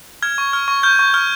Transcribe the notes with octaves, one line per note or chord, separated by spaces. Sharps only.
F6 G#6
C#6
F6
C#6
F6 G6
C#6
F6